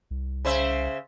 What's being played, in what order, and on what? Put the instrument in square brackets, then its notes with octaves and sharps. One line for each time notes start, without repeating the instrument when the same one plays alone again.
[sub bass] C2
[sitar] C#3 C5 E5